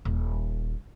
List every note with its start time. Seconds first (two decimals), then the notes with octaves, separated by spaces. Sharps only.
0.05 D#1